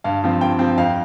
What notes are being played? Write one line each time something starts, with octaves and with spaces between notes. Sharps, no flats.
G2 F5
F3 C4
G2 G5
F3 C4
F2 F5